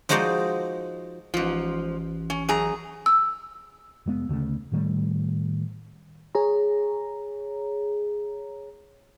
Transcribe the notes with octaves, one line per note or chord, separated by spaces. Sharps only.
F3 G#3 D#4 F#4 C5 D5
A1 G#2 F3
C#4
F#2 G#4 A#5
E6
F1 G#3 B3
D2 C#3 F3 A3
A2 D#3 G3 A3
G#4 C#5 A#5